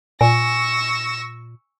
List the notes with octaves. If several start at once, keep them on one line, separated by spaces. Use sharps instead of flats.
A#2 G#5 C#6 E6 A#6